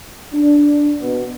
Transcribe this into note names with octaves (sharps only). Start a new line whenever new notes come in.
D4
B2 B3